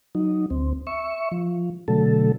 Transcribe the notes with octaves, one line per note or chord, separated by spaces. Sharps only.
F#3 D#4
D2 C4
E5 C#6
F3
B2 D3 F#3 A3 A4